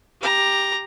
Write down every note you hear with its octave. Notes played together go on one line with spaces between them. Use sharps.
G4 A#5